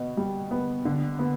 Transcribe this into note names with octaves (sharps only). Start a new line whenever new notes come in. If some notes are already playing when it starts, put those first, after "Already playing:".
Already playing: B2 B3
G3
B3
D3
B3